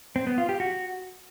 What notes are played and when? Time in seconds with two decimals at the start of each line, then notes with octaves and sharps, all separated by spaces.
0.16 C4
0.27 B3
0.38 F4
0.49 G4
0.60 F#4